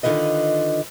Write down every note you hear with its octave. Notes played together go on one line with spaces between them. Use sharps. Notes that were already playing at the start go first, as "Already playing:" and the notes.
D3 D#3 F4 B4 D#5